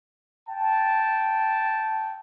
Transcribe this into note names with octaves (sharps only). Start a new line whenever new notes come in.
G5 A5